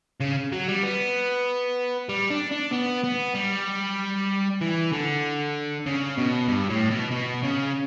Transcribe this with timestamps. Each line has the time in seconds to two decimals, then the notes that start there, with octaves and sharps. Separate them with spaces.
0.20 C#3
0.52 F#3
0.68 G3
0.83 B3
2.09 G3
2.30 D4
2.52 D4
2.73 B3
3.04 B3
3.35 G3
4.61 E3
4.92 D3
5.86 C#3
6.18 B2
6.48 G2
6.70 A2
6.91 B2
7.12 B2
7.43 C#3